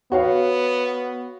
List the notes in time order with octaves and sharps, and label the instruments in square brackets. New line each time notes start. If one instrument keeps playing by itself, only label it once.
[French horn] B3 [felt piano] F#4 C#5 F5